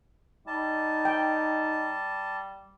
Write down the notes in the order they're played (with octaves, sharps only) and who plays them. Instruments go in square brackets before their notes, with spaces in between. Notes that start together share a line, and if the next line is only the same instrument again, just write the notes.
[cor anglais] G3 [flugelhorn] D#4 [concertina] A5
[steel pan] G5